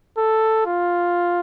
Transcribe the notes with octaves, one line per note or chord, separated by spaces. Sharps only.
A4
F4